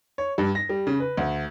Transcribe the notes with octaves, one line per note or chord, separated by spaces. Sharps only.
C#5
G2
A#6
G3
C#3
B4
D2